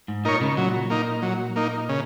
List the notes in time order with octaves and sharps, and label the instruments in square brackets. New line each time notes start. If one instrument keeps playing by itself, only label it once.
[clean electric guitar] G#2
[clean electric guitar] A#2 [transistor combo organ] D#4 A#4 C#5
[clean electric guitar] C#3
[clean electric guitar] A#2 [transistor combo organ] F#3
[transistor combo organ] A#3 D#4
F#3
A#3 D#4
C#3